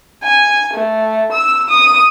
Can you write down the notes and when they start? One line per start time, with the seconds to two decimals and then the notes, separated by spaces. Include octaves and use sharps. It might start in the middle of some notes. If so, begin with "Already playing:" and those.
0.23 G#5
0.73 A3
1.32 E6
1.68 D#6